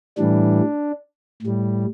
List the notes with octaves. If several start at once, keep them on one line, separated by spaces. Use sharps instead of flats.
A2 E3 G3 D4
A2 G3